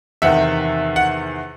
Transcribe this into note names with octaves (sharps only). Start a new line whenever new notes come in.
E2 C3 D#3 E5 F#5
F#5